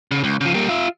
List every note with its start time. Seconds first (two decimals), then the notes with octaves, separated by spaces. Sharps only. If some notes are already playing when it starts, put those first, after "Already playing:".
0.11 C#3
0.24 C#2
0.41 C#3 F3
0.54 G3 A#3
0.69 F4 E5